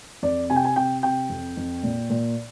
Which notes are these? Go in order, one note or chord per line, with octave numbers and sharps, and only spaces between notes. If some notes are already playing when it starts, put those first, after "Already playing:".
F2 D5
C3 G#5
G5
G#5
C3 G5
C3 G5
F2
F2
A#2
A#2